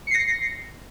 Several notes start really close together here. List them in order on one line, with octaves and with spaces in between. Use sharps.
C#7 C7 A#6